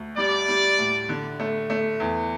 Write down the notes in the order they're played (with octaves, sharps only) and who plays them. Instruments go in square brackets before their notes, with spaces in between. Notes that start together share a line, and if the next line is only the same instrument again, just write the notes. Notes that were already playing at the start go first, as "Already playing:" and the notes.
Already playing: [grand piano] D2
[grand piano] G3 [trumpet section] D5
[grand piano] G3
A2
D3
A3
A3
E2